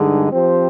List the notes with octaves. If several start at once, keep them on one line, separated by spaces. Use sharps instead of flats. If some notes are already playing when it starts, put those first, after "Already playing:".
Already playing: G2 D3 G#3 D#4 G#4
F3 C4 G4 C5